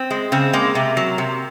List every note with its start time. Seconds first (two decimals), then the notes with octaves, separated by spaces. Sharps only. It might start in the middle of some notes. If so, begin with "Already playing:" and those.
Already playing: C4
0.11 G#3
0.32 C#3 C4
0.53 G#3 A#3
0.75 C3
0.97 F#3
1.18 C3